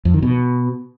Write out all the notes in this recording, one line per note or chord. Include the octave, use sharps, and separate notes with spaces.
F2
D#3
B2